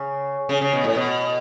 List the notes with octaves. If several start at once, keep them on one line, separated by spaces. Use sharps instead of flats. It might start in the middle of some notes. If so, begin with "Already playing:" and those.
Already playing: C#3
C#3
C#3
B2
A2
B2